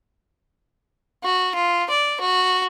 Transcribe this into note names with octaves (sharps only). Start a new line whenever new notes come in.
F#4
F4
D5
F#4